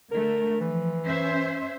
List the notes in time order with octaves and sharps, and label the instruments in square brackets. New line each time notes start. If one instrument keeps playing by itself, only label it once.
[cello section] D3 A3 [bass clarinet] A#4
[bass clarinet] E3 [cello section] F3
[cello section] C#4 C5 E5